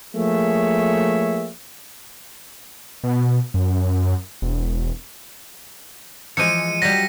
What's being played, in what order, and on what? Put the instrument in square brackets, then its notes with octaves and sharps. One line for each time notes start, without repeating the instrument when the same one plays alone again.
[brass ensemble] F3 A3 A#3 G#4 C#5 E5
[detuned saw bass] B2
F#2
E1
[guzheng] E3 F3 G#3 [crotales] C#7 D#7
[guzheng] F#3 G3 [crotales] A#6 B6